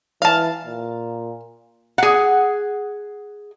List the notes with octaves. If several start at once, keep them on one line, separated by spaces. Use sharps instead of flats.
E3 F5 A5
A#2
G#4 F#5